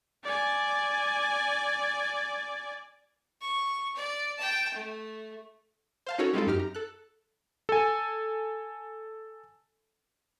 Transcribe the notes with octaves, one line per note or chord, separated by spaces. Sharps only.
D5 G#5
C#6
D5
G5 A5
A3
C5 F5 A5
C#4 D#4 F#4 A4 A#4 C#5
G3 G#3 C4 D#4 F4 A4
F#2 D#4 G4 F6
A#5
A4 F#6
A4 G#5